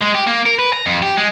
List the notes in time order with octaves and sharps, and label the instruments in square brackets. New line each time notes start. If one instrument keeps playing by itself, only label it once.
[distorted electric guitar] G#3
G4
A#3
A#4
B4
A#5
F2
G4
G#3